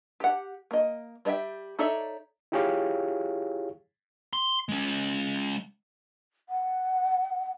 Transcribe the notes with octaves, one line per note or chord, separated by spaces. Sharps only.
G4 F#5
A#3 D#5
G3 C#5 D#5 E5 G5
D#4 A4 C#5 D5 E5
E4 F4 G4 G#4 C#5 F5
C6
G#3 C#4
F#5